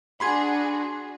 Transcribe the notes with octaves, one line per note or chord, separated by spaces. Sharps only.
D4 F#4 G#4 B5 C6 G#6